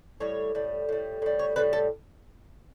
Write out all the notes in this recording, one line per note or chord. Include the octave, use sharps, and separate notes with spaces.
A2 G3 C#5
A2 G3
A2 G3
A2 G3
C#5
A2 E3 G3 B4
A4